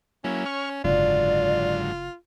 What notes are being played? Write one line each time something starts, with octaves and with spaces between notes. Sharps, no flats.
F#3 A#3 C#4 E4
C#5 C#6 F6
F#1 G#2 D3 F#3 F4 D5